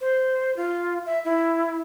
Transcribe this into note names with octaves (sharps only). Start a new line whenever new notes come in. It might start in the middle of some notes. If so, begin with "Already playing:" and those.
C5
F4
E5
E4